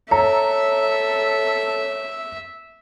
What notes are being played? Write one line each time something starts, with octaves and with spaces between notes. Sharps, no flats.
A4 C#5 E5 A#5